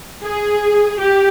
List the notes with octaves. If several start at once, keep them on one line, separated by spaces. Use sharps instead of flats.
G#4
G4